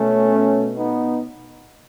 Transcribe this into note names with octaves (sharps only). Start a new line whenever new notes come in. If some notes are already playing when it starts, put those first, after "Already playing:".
Already playing: B2 A3 C#4
B3 D#4